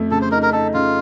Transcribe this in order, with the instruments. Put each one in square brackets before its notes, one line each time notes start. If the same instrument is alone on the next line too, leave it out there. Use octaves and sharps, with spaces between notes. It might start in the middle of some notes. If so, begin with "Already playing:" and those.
Already playing: [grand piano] F2 A3
[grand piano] C#3 [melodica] A4
[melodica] C5
[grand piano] D#4 [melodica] A#4
[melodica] A#4
[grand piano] D#4 [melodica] A4
[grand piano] C#3 [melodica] F4